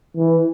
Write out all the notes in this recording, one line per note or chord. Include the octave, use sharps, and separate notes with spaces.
E3